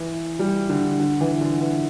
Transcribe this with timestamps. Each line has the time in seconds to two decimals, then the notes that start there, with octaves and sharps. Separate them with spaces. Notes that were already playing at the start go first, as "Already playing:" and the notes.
Already playing: E3
0.39 G3
0.69 D3
0.99 D3
1.21 E3
1.41 D3
1.61 E3